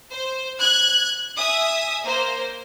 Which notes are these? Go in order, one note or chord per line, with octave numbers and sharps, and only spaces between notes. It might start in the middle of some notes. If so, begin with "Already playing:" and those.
C5
F#6 G#6
E5 G#5 D#6
A#3 C5